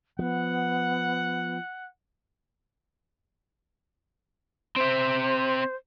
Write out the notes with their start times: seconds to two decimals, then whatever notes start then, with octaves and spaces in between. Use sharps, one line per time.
0.19 F3 B3 F#5
4.76 C4 C5 E5